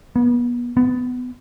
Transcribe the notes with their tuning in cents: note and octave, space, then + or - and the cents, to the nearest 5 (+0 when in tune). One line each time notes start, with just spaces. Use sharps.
B3 -35
B3 +20